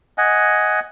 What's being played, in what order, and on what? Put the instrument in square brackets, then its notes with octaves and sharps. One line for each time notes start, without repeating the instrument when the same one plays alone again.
[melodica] D#5 F#5 G#5